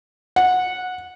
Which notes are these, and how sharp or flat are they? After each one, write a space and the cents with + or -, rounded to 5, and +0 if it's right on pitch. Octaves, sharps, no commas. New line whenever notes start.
F#5 -15